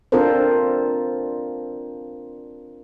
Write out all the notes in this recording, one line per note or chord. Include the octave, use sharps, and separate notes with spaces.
C4 D4 F4 A4 A#4 C5